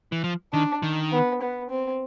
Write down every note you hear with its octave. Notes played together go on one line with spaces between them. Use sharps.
E3
F3
D#3 D4
D#3
B3
B3
C4